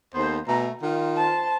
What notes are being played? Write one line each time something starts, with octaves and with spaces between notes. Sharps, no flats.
D#2 B3 A4 C5
B2 A3 G#5 A#5
D#3 F4
C5 A5